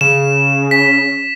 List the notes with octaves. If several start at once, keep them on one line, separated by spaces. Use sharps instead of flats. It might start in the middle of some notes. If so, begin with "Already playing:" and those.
C#3 E7
B6